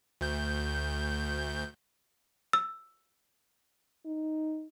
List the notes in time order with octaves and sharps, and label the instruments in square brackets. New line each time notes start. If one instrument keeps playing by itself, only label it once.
[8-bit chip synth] D2 G6
[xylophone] E6
[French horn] D#4